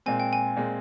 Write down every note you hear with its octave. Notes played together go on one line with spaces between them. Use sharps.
A#2 G#3 C4 G#5
G5
G#5
A#2 G#3 C4